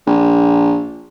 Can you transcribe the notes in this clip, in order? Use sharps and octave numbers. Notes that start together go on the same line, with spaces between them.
A#1